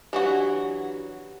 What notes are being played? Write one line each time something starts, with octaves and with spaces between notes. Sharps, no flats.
E3 F#3 D4 F#4 G4